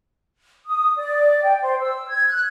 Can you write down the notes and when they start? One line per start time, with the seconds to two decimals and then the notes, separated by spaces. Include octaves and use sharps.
0.67 D#6
0.97 D5
1.43 G5
1.63 C5
1.80 E6
2.09 G#6
2.29 F#6